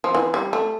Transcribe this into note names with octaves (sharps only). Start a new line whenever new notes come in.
F3
E3
G3
A3